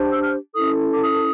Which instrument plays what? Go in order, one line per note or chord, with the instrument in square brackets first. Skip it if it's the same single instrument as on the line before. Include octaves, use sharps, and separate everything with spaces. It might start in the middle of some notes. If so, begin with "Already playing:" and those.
Already playing: [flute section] D4 G4 C5
E6
F6
C#4 E4 A4 D#6
D6
D#6